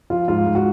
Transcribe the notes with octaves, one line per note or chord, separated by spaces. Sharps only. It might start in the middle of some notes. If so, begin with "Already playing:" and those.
F3 F4
G#2 F4
G#2
F#4